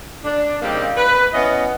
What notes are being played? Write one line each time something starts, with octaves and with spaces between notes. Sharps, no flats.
D4
C#3 G3 A#3 C4 D#4 G4
B4
E3 B3 C#4 D#5